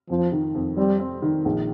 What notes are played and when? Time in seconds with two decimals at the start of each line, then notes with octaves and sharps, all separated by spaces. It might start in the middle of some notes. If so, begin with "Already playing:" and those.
0.09 F2 F3
0.32 D#3
0.55 F2
0.77 G3 C4
1.00 C4
1.22 D#3
1.45 A#1